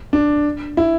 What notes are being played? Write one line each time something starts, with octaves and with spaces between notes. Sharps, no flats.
D4
E4